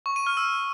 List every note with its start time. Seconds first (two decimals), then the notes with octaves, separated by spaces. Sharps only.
0.06 C#6
0.16 D#7
0.27 F6
0.37 E6